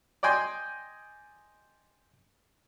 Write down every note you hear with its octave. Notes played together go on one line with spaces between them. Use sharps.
D5 D#5 G5 G#5 C6